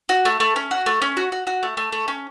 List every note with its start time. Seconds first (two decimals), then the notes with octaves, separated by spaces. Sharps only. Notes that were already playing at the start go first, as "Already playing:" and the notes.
0.09 F#4
0.25 A3
0.40 A3
0.56 C#4
0.71 F#4
0.86 A3
1.02 C#4
1.17 F#4
1.32 F#4
1.47 F#4
1.63 A3
1.77 A3
1.92 A3
2.08 C#4